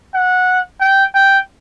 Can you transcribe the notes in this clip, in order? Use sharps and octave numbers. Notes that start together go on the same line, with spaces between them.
F#5
G5
G5